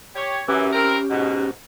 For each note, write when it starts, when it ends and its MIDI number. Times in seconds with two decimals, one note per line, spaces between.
0.16 0.41 67
0.16 0.41 73
0.48 0.68 42
0.48 0.68 52
0.48 1.51 61
0.48 1.51 67
0.72 0.96 60
0.72 0.96 64
0.72 0.96 70
1.10 1.48 44
1.10 1.48 47